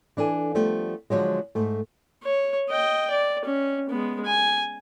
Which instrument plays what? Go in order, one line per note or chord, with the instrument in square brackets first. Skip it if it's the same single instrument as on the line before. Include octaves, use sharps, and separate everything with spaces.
[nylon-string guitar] E3 D4 A4 G#5
F3 G3 A3 B3
D3 F3 F#3 G#3
G#2 A3
[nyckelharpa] C#5
D#5 G5
D5
C#4
G#3 B3
G#5